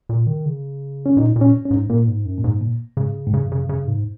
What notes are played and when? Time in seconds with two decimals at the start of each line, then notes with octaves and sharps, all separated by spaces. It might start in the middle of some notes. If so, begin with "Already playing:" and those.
0.09 A#2
0.27 D#3
0.46 C#3
1.06 C#4
1.17 A#2 D#4
1.36 A#2
1.41 C#4
1.65 C#4
1.71 G#2
1.89 A#2 A#3
2.07 G#2
2.25 F#2
2.38 A#2
2.44 G#2
2.61 A#2
2.97 G#2 C#3
3.27 G#2
3.34 F#2 C#3
3.52 C#3
3.69 C#3
3.88 G#2